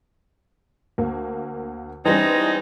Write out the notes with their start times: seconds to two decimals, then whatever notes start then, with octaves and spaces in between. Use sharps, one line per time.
0.98 D2 A#3
2.05 E3 G3 G#3 C4 C#4 D#4